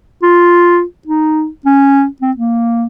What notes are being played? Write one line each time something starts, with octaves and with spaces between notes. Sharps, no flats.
F4
D#4
C#4
C4
A#3